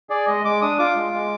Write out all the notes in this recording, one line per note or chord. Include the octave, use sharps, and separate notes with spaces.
G#4 D5
G#3 D#5
G#3 D6
D4 D#6
F4 D6
G#3
G#3